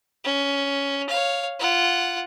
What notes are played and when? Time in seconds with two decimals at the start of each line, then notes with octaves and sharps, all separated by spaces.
0.24 C#4
1.09 C#5 F5
1.60 F4 F#5